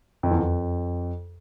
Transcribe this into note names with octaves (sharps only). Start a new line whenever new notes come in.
F2
E2
F2